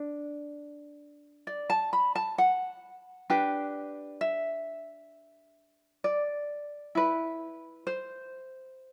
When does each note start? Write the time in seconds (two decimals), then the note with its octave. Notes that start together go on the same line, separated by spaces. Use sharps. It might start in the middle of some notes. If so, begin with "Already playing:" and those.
Already playing: D4
1.47 D5
1.70 A5
1.93 B5
2.15 A5
2.38 F#5
3.30 D4 G4 B4
4.21 E5
6.04 D5
6.95 E4 B4
7.87 C5